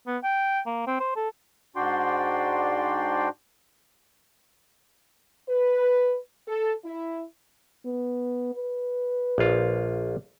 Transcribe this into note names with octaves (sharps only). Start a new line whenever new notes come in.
B3
G5
A#3
C4
C5
A4
G#2 D4 F#4 D5 G5 C6
B4
A4
E4
B3
B4
A#1 F4